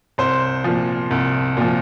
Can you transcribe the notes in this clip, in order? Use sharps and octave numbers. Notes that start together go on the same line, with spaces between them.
C2 C5
A#2 F3
C2
A#2 F3